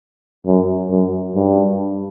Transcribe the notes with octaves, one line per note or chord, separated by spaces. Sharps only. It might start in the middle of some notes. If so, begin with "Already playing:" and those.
F#2
F#2
G2